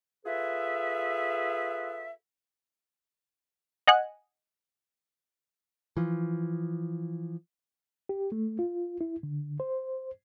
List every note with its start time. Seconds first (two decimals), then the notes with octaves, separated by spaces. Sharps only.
0.24 F4 G#4 A4 B4 E5
3.87 D#5 F#5 G#5 F#6
5.97 E3 F3
8.09 G4
8.32 A3
8.59 F4
9.01 E4
9.23 D3
9.60 C5